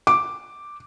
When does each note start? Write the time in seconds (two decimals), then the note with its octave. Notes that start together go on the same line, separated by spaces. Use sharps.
0.07 D6